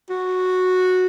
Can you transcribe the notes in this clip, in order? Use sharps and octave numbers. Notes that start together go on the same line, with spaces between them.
F#4